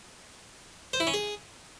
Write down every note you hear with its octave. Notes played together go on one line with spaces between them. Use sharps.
C5
E4
C#4
G#4